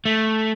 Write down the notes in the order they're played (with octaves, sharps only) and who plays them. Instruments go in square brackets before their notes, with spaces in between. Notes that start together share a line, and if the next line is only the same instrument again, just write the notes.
[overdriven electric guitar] A3